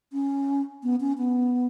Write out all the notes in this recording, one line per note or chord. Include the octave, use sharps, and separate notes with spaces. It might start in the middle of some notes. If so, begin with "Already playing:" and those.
C#4
B3
C#4
B3